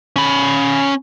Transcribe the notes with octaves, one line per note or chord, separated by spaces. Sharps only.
C#4 B5